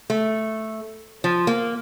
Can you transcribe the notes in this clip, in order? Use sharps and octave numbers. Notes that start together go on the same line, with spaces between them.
A3
F3
A#3